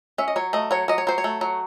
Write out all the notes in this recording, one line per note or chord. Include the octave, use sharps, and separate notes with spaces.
C#4 E5
D#5
F#3 C#5
A3 D#5
F#3 C#5
F#3 D#5
C#5
F#3 C5
C#5
A3
F#3